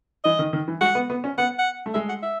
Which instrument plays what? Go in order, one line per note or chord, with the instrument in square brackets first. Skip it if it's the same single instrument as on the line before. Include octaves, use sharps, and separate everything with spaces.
[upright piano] E3 [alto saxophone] D#5
[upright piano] D#3
D#3
E3
[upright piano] G#3 [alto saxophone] F#5
[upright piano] B3
B3
C#4
[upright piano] B3 [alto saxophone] F#5
[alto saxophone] F#5
[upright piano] A3
[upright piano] G#3 [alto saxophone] E5
[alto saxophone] F#5
E5